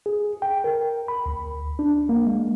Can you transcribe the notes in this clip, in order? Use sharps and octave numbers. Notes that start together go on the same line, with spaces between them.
G#4
G5
A#4
B5
D2
D4
A#3
G#3